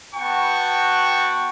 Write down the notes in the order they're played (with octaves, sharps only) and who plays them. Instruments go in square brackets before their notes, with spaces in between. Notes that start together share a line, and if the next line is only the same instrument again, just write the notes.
[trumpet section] B3 F#4 G5 A5 C#6